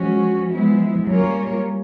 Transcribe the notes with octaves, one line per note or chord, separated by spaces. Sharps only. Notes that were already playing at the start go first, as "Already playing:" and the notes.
Already playing: F3 G#3 C#4 F#4
G#3 B3 E4
F#3 A#3 C#4 F4 A#4 C#5
G3